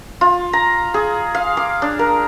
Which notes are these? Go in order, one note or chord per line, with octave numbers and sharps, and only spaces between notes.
F4
A#5
G#4
F5
D6
D4
A#4